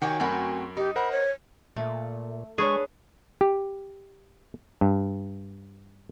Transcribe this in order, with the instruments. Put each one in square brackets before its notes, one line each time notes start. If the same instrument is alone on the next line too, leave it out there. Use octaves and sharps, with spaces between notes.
[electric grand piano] D#3 [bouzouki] F#4 G4 C#5 [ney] G#5
[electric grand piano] F#2 A#4 B5 [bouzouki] A3 C4 F#4
[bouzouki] D#4 [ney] G4
[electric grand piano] A#4 C5 F#5 [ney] B5
[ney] C#5
[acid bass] A#2 [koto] A3
[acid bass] G#3 [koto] D4 B4 [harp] G#4 C#5 [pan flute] C#6
[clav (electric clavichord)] G4
G2